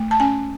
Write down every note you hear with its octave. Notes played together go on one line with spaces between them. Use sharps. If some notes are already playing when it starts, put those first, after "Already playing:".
Already playing: A3
A5
C#4 G#5